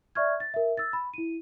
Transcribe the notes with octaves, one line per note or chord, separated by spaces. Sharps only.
D5 E5 C#6 F6 G#6
A6
A#4 E5
E6 A6
B5
E4 D#7